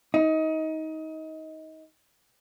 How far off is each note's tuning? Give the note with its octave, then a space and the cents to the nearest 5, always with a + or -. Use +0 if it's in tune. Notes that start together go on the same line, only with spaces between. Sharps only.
D#4 +25